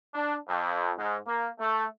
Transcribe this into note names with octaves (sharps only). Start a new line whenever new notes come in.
D4
F2
G#2
A#3
A3